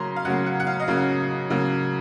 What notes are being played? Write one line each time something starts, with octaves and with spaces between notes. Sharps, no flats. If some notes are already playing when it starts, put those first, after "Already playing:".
Already playing: C#3 F#3 A#3 A#5 C6
F5
C#3 F#3 A#3 F#5
F#5
F#5
F5
D#5
C#3 F#3 A#3 F5
C#3 F#3 A#3